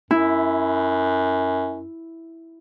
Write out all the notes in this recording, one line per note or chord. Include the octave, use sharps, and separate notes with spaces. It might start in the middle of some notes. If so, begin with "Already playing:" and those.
F#2 E4